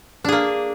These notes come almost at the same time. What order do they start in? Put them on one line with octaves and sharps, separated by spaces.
D4 G#4 A#3